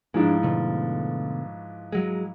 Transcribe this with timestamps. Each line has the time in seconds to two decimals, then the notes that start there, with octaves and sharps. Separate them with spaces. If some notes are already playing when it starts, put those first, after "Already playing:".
0.14 G#2 E3 F3 G#3 D4
0.43 B2 D3 A3
1.92 F#3 G#3